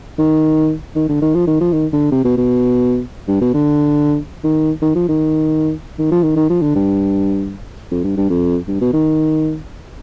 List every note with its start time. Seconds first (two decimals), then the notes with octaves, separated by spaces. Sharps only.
0.19 D#3
0.96 D#3
1.09 D3
1.22 D#3
1.34 F3
1.47 D#3
1.61 F3
1.73 D#3
1.93 D3
2.12 C3
2.25 B2
2.37 B2
3.28 G2
3.41 B2
3.54 D3
4.44 D#3
4.82 D#3
4.95 F3
5.08 D#3
5.99 D#3
6.11 F3
6.23 D#3
6.36 D#3
6.50 F3
6.62 D3
6.75 G2
7.91 F2
8.04 G2
8.17 G2
8.30 F2
8.68 G2
8.81 B2
8.93 D#3